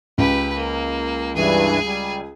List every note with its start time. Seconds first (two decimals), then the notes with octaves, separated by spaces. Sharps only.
0.18 C#2 G4 B4
0.56 A#3
1.36 G2 E3 G#4 G#5
1.86 G3